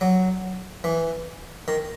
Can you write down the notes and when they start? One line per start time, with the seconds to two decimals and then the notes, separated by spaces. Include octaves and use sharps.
0.01 F#3
0.84 E3
1.68 D#3